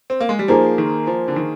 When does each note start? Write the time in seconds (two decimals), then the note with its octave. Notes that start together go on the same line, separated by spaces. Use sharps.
0.10 C4
0.20 A#3
0.29 G#3
0.39 G3
0.48 F3 A#3 D#4 G#4 C5
0.78 D#3
1.07 F3
1.28 D3
1.36 D#3